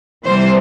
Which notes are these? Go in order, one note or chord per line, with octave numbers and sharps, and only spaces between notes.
C3 E3 G3 C5